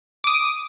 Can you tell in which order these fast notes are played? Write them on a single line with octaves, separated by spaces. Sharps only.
D6 D#6 D#7